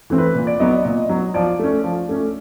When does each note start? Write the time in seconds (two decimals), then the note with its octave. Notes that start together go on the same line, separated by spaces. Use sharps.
0.10 E3 A3 C4
0.18 B4
0.35 A#2
0.47 D5
0.60 F#3 B3 D#5
0.72 D5
0.85 A#2 D#5
1.09 F#3 B3
1.34 F3 D5
1.59 A3 C#4
1.84 F3
2.09 A3 C#4